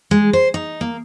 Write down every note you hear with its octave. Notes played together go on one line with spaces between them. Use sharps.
G#3
C5
D#4
A#3